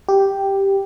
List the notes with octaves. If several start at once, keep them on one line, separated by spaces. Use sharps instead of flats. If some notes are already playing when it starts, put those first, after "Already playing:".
G4